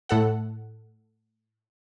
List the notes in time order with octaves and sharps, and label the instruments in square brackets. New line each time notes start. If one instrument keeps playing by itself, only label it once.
[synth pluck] A2 A4 F#5